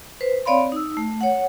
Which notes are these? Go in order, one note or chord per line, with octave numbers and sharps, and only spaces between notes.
B4 C5
C4 C#5 D5 F5 B5 C6
D#4 E6
A3
C#5 F#5